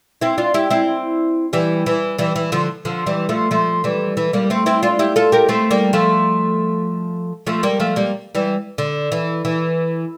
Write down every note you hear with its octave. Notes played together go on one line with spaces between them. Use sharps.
C4 E4
D4 F4
E4 G4
C4 E4
E3 G3
E3
E3 G3
E3
D3 F3
D3 F3
E3 G3
F3 A3
F3 A3
E3 G3
E3
G3 A#3
A3 C4
C4 E4
D4 F4
E4 G4
F4 A4
G4 A#4
A3 C4
G3 A#3
F3 A3
F3 A3
G3 A#3
F3 A3
G3 A#3
E3 G3
D3
E3
E3